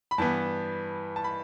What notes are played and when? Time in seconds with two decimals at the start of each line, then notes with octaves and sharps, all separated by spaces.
0.11 B5
0.18 G2 E3 B3 A5
1.16 A5
1.24 B5